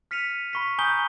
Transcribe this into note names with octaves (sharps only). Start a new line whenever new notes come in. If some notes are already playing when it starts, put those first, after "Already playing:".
F6 B6 C#7 D#7 F7
B5 C#6 B6
G#5 A#5 D#6 G6 G7